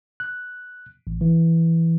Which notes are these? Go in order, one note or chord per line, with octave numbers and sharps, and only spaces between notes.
F#6
A1
E3